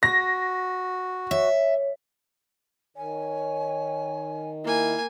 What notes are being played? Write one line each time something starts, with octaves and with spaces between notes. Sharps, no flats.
F#4 A#6
C#5 E5
D#3 C#5 G#5
A#3 E4 G#5